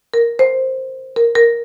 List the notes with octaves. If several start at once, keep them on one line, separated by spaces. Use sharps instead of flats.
A#4
C5
A#4
A#4